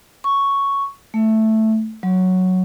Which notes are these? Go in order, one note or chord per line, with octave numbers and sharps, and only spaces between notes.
C#6
A3
F#3